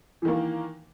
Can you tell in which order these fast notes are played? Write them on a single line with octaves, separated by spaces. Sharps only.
E3 D#3 A#3